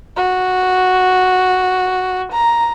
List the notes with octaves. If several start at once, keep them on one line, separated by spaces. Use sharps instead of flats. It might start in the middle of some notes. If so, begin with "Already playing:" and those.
F#4
A#5